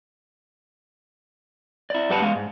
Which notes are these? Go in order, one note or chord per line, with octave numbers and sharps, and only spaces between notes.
E4 D5
G2 G4 B4 F#5 A5 B5
G#3 B3 F5
G#2